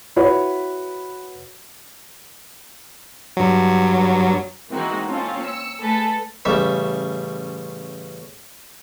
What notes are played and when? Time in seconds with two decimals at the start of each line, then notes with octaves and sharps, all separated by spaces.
0.16 E4 F#4 B4 C#5
3.37 G2 F#3
4.70 E3 G#3 A#3 C4 D#4 F#4
5.08 A#3 C4 C#4 F4 A4
5.42 E6 C#7
5.81 A3 G#4 A4 B4 A5 B6
6.45 A1 C#3 G3 E5